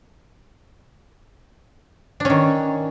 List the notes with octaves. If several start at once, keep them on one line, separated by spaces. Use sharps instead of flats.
D#3 C#4 D4